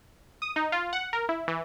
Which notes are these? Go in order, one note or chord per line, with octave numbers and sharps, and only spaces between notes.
D#6
D#4
F4
F#5
A#4
E4
E3